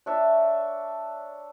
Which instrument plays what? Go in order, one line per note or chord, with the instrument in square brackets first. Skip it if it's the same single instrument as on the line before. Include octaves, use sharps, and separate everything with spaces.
[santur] D4 C#5 E5 A5